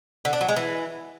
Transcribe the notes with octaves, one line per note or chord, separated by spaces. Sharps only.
D3
D4
F#3
G#3
E3